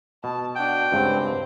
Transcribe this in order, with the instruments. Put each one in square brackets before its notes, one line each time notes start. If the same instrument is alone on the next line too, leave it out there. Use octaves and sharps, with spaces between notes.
[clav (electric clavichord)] B2 [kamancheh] A5
[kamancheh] D4 F#4 [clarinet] G5
[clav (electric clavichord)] C#2 G2 [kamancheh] C4